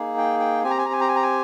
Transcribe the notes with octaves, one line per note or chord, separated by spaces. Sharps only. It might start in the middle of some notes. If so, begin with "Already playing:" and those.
Already playing: A#3 D#4 G#4
G5
G5
C4 G4 G#5
A#5
G#5
A#5
G#5
A#5
G#5
A#5
G#5